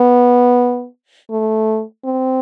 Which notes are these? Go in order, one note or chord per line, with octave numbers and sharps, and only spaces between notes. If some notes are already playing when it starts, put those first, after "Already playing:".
Already playing: B3
A3
C4